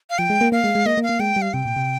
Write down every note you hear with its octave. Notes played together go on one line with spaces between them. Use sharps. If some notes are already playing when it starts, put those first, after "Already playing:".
F5
F3 G5
G#3
A#3
A#3 F5
G#3
G#3
A#3 D#5
A#3
F5
A#3
G#3 G5
G3
F5
C3 G5
A#2
C3